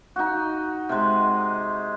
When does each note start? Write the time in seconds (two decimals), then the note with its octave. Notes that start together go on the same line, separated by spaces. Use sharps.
0.16 D#4 F#4
0.89 C3 G#3